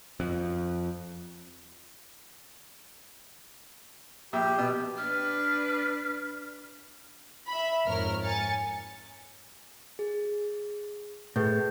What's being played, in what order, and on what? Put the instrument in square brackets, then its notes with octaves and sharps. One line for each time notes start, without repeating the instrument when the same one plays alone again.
[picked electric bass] F2
[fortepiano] A#1 E5 [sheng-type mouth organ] G4
[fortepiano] B2
[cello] D4 B4 [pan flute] F6
[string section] E5 B5
F2 G#2 A#4 C#5 F6
G#5 A6 C#7
[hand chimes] G#4
[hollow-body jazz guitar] A2 [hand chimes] G#4 B4 G6